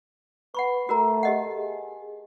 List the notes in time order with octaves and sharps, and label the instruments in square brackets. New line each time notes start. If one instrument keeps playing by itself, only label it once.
[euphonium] B4 [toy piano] F#5 B5 C#6
[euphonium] A3 [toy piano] F#4 A#4 A#5
[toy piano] G4 D#5 F#5
[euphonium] G#4